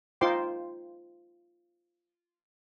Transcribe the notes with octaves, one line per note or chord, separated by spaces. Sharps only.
D#4 F4 C5 G5 C6 D6